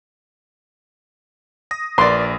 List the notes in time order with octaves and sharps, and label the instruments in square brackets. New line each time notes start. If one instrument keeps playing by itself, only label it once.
[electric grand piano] D#6 A#6
[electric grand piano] A#1 A#4 B4 [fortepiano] D5 C6